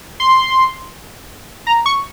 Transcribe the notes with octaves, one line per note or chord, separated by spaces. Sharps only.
C6
A#5
C#6